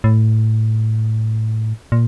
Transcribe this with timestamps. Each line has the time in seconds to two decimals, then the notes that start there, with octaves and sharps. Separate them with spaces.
0.04 A2
1.92 A#2